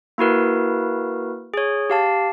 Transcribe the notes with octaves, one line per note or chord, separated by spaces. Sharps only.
A#3 E4 F#4 A#4 B4
G#4 C#5
G4 F5 A5